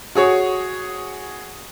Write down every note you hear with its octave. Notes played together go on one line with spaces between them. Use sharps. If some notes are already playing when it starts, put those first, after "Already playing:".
F#4 G#4 C#5